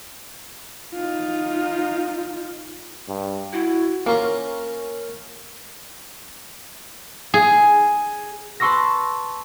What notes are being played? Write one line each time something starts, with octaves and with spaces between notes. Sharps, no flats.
D#4 F4
G2
E4 F#4
A#3 C#4 F4 A#4
G#4
B4 A5 C6 C#6 E6 A#6